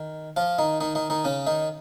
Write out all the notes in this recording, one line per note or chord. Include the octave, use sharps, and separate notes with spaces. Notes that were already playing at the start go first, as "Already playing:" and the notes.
Already playing: D#3
F3 F4
D#3 D#4
D#3 D#4
D#3 D#4
D#3 D#4
C#3 C#4
D#3 D#4